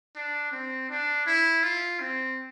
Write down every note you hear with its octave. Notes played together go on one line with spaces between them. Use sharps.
D4
C4
D4
E4
F4
C4